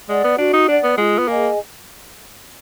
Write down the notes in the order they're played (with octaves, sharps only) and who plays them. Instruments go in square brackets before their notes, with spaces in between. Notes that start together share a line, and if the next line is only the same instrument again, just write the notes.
[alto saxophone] G#3 [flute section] D5 F#5
[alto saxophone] B3
[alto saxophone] D4 [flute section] F#4
[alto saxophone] D#4
[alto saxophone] D4 [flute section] D5 F#5
[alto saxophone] B3
[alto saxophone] G#3 [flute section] F4
[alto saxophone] B3
[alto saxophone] A#3 [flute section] G#4 D#5 G#5